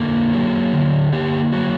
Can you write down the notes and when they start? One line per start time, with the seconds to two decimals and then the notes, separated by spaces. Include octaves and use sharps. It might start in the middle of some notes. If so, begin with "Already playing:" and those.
Already playing: D3 A#3 A4
0.33 F#3
0.73 D3
1.13 A#3 G4
1.52 F#3 F#4